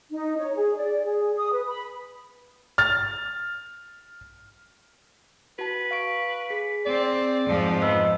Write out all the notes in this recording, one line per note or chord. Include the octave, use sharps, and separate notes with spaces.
D#4
C#5
G#4
D5
G#4
D#6
B4
B5
F6 A6
F#4 B4 A5
F5 C#6 D7
G#4 B6
C4 D5
F2 G#2 F3
B3 C5 D#5 E6